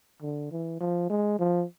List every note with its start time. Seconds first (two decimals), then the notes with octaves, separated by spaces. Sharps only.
0.22 D3
0.51 E3
0.80 F3
1.09 G#3
1.39 F3